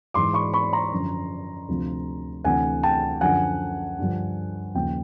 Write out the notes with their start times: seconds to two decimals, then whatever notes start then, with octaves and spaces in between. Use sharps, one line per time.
0.14 G#2 E3 C6 D6
0.34 B5 C#6
0.53 B5 C#6
0.73 A#5 C6
0.92 F#2 D3 F3
1.68 D2 C3 F3
2.44 D2 C3 E3 F#5 G#5
2.83 G5 A5
3.21 F#2 D3 F3 F#5 G#5
3.99 G2 D3 F3
4.74 D#2 C#3 F3 G5